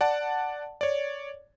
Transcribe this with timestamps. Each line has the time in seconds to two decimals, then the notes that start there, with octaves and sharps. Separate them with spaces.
0.01 D5 F#5 A5
0.81 C#5 D5